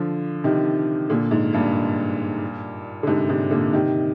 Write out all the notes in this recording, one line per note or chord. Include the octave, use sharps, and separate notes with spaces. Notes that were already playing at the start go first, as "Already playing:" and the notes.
Already playing: D3 F3
C3 D#3
A#2 D3
G#2
G2 A#2
D3
G#2 C3
G#2 C3
A#2 D3
C3 D#3